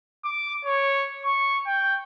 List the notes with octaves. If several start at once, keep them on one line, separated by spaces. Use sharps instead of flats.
D6
C#5
C#6
G5